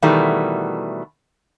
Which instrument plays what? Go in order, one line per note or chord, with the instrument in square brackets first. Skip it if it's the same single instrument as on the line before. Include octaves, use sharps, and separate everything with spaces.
[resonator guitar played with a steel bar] B2 D#3 E3 G3 A3